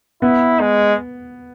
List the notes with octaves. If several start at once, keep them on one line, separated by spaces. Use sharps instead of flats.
B3 E4
G#3